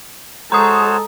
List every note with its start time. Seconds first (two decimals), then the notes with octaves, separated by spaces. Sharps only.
0.52 G#3 F#4 A4 C5 C#5 A#5 D#6